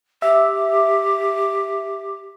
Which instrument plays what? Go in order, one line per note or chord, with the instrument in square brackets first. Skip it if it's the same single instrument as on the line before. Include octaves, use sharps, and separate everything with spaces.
[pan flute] G4 [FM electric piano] E5